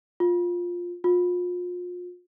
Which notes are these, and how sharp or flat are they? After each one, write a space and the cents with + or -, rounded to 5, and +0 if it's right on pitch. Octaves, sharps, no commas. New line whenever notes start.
F4 +10
F4 +35